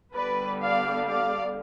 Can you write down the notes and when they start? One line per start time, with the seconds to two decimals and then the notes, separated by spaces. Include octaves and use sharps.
0.15 D3 G3 B3 B4 D5
0.61 D5 F5
1.08 D5 F5